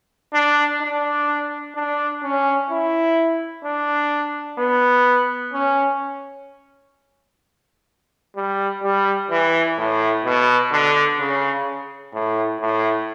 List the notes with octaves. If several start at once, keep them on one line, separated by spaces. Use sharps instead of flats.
D4
D4
D4
C#4
E4
D4
B3
C#4
G3
G3
E3
A2
B2
D3
C#3
A2
A2